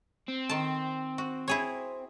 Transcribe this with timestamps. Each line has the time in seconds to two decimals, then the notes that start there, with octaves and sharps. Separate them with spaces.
0.28 C4
0.50 D#3 A5
1.18 F#4
1.48 E4 G#4 C#5